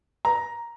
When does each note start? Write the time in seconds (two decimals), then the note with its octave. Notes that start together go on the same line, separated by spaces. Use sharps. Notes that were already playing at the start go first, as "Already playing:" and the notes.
0.25 A#5